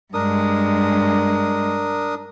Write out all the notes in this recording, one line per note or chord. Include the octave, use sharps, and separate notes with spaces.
G2 G#3 D4 A#4 D#6